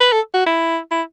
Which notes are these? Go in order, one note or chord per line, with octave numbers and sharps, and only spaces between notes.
B4
A4
F#4
E4
E4